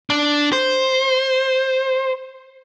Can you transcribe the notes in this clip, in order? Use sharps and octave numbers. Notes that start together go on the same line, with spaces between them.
D4
C5